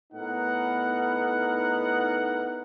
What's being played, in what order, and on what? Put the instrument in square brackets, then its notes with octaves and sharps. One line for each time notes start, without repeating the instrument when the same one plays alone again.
[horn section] A2 B3 D#4 A#4 F#5